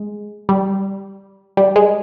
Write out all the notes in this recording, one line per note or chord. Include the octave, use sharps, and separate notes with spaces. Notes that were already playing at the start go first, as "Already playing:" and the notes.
Already playing: G#3
G3
G3
G#3